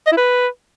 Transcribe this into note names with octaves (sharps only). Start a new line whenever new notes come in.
D#5
E4
B4